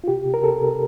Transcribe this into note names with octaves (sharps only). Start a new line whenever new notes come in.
F4
C3 G4
C3
A#4
C3 A4
C3